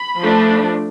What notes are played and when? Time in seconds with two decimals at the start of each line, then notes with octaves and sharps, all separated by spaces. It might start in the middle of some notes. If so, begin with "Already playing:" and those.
Already playing: B5
0.21 F3 A3 D4